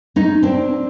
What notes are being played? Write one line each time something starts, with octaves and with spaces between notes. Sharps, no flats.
C#4 D#4
C4 D4